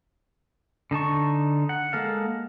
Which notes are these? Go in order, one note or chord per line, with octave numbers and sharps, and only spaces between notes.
D3 D#4 A5 C#6
F#5
G#3 A#3 A4 F5